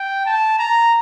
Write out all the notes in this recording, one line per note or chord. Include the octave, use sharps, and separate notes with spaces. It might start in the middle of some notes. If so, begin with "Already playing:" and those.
Already playing: G5
A5
A#5